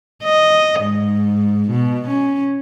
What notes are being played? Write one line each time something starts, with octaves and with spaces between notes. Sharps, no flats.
D#5
G#2
B2
C#4